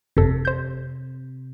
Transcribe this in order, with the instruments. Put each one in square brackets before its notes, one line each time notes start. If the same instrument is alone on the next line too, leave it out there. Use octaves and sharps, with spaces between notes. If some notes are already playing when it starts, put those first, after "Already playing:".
[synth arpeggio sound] G1 F2 A4 [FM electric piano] C3
[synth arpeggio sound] C5 G6